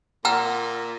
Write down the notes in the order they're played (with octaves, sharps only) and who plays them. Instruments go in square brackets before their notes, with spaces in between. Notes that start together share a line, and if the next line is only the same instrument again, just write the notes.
[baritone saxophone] A#2 [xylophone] F#5 E6 F6 [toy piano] A#5